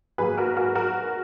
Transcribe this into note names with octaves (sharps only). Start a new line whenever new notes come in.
G#2 F#3 A#3 G#4 B4
F#4 A#4
F#4 A#4
F#4 A#4